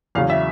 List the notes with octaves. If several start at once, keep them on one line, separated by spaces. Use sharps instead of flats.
E2 C#3 F#3 F5
E5